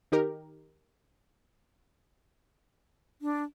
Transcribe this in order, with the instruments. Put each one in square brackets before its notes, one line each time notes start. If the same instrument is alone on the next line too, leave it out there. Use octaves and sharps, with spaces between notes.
[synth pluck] D#3 D#4 G4 A#4
[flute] D4